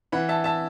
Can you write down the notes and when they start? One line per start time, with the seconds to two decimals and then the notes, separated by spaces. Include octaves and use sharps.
0.12 E3 F#5 B5
0.29 E5 A5
0.44 E5 A5